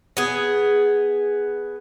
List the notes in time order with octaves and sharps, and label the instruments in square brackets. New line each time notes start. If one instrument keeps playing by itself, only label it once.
[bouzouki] B3 G#4